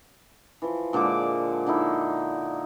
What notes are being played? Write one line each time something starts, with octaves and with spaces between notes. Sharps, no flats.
E3 F3
A#2 D3 G#3 D6
D3 D#4 E4